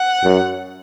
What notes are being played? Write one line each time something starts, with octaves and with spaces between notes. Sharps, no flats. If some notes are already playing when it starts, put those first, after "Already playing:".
Already playing: F#5
F#2